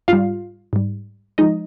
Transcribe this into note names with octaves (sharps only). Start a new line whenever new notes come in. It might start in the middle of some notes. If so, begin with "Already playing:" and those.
G#2 G3 F4 F5
G#2 G3
F3 G#3 D#4 D#5